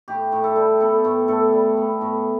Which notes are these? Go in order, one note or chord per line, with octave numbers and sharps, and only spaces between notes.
A2 G4
A2
A4
G3
B3 A4
A2
A2 A4
G3
B3
A2